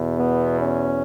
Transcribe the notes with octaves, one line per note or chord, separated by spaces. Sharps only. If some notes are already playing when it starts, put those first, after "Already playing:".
Already playing: E2 B2
B3
C#4